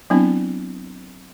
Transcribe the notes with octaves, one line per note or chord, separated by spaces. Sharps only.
F#3 B3 C4 D4 E4